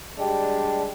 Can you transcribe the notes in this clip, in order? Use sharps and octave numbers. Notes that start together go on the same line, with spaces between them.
G3 G#3 D4 G4